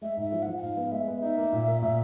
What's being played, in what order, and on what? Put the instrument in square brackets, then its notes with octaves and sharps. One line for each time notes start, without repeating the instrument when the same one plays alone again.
[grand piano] G#3 [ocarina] E5
[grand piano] G#2
[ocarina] E5
[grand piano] F3
[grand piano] F3 [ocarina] F#5
[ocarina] F#5
[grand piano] G#2 [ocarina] F5
[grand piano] B3
[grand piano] G#3 [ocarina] E5
[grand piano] B3
[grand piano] D#4 [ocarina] E5
[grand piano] A#3
A#2
A#3
A#2